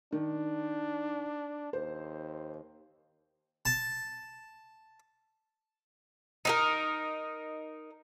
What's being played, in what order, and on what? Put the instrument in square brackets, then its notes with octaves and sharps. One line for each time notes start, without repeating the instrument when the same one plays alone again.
[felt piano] D#3 [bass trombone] D4
[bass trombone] D#2 [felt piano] C5
[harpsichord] A5
[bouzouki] D#4 E4 A#4